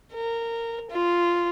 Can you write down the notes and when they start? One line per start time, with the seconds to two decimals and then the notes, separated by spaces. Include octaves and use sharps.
0.13 A#4
0.91 F4